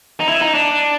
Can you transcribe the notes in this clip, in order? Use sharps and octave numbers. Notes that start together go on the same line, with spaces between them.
D#4
E4
D#4
D4